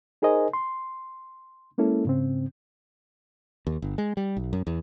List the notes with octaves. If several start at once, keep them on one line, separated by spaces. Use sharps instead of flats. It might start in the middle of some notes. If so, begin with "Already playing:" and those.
D#4 G#4 A#4 C5 D#5 G#5
C6
G#3 A#3 C#4 E4 A4
G#2 C#3 C4
D#2
G1
G#3
G3
B1
F#2
E2